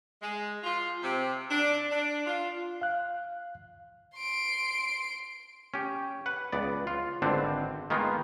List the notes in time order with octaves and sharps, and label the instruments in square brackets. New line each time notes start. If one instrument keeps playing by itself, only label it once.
[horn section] G#3
F4
C3
D4
D4
F4
[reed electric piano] F5 F#6
[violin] C6 D7
[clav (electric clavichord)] C#4 G4
B4 F#5
C#2 B3 D5
F4
G#1 D3 B3 C4 D4 C5
D#3 G#3 A#3 B3 F4